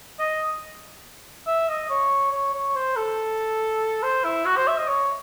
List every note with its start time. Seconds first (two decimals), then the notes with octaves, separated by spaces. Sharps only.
0.19 D#5
1.47 E5
1.69 D#5
1.90 C#5
2.32 C#5
2.54 C#5
2.76 C5
2.96 A4
4.03 C5
4.24 E4
4.45 F#4
4.57 C5
4.67 E5
4.78 D#5
4.88 C#5